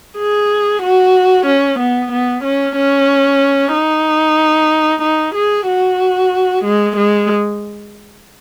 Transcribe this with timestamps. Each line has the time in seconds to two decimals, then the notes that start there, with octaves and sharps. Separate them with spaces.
0.18 G#4
0.82 F#4
1.46 C#4
1.79 B3
2.12 B3
2.44 C#4
2.76 C#4
3.73 D#4
5.02 D#4
5.35 G#4
5.67 F#4
6.64 G#3
6.96 G#3